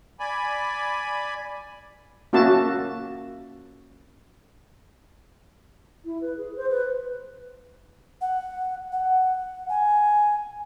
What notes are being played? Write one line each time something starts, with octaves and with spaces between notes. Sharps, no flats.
D5 G#5 B5
A#3 C#4 F#4 E5 A5
E4
B4
G#4
C5
B4
F#5
F#5
G#5